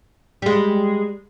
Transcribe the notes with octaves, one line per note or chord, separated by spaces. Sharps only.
G3 G#3